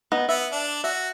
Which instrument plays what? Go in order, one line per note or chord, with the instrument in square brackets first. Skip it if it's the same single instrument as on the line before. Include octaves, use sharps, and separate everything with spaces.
[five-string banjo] B3 D#4
[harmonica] B3 [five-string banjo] E5
[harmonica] D4
[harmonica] F#4 [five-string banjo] E5